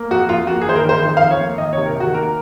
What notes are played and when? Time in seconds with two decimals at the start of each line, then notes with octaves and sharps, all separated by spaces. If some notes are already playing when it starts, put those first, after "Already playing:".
Already playing: A#3
0.10 F2 F#4
0.29 F2 F4
0.47 A#3 F#4
0.62 G#4
0.67 D#3 C5
0.76 A#4
0.85 D#3 C5
1.03 F2 C5
1.17 F5
1.21 F2
1.31 C#5
1.41 A#3
1.58 D#3 D#5
1.73 C#5
1.77 C3
1.86 A#4
1.96 D#3 F#4
2.14 A#3 A#4